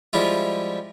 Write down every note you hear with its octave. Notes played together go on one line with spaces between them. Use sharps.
F3 G3 G#3 E4 F4